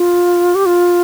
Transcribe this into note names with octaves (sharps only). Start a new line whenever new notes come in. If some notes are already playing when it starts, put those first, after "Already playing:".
Already playing: F4
G4
F4